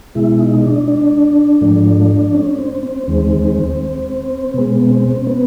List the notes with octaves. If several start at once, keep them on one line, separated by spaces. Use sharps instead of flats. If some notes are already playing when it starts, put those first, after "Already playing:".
B2 G#3 E4
D#4
D4
D4
G#2 F3 A3
C#4
C4
C4
D#2 D#3 G#3 C4
B2 G#3 B3
B3
C4
C4
B3